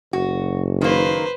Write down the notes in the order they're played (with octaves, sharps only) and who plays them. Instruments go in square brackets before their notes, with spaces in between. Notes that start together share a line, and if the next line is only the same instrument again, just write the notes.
[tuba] F#1 [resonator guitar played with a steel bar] F#4
[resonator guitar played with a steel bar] D#3 A#3 [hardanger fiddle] B4 C5